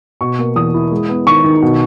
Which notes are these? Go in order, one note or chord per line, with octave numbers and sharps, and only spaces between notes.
B2 C#6
A#3
E2 D#6
E4
G#3
B3
D#3 C#6
D#3
B2